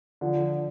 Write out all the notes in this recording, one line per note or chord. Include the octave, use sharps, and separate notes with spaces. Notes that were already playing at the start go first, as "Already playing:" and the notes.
D3 F3